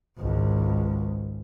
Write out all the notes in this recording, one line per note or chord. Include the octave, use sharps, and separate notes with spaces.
G#1 C#2